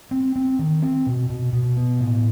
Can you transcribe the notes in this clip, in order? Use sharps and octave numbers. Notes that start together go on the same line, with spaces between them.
C4
C4
D#3
C4
B2
B2
B2
B3
A2